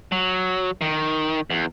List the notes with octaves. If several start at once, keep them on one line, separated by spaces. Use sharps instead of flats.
F#3
D#3
E2